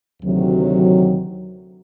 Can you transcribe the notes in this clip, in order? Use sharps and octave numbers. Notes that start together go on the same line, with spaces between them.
D2 C3 D#3 F#3